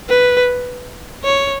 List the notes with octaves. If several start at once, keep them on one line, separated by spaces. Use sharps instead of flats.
B4
C#5